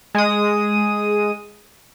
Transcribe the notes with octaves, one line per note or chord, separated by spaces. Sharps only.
G#3 D#6